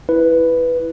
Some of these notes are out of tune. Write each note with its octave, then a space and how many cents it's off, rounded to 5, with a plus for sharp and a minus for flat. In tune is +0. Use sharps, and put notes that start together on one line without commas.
E4 +0 B4 +0